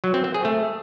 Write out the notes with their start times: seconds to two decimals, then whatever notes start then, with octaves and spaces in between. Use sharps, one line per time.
0.04 F#3
0.14 C4
0.24 C4
0.34 G#4
0.45 A3